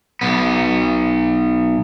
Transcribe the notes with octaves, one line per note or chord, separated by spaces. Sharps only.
B1 B3